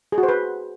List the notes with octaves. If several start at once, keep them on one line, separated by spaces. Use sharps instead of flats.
G#4
F#4
C5
B4